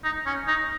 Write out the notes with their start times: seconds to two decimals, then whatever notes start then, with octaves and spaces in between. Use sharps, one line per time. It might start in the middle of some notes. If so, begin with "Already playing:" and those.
0.04 D#4
0.26 C#4
0.47 D#4